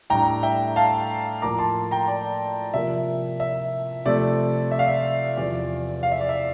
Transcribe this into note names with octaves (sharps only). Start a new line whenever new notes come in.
A2 G3 D4 G5 A#5
E5 G5
F5 A5
A2 F3 A#3 A#5 D6
A5 C6
G5 A#5
D5
C3 F3 A#3 E5
E5
C3 F3 A3 C4 D5
E5
F5
E5
E2 C3 F3 D5
F5
E5
D5
E5